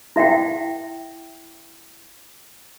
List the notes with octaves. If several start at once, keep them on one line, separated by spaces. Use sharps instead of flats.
E4 E5 F#5 G5